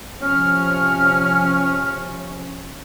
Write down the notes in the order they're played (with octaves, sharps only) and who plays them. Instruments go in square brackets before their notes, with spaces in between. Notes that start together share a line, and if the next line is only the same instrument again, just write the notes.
[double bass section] C3 F3 C#4 [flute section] F6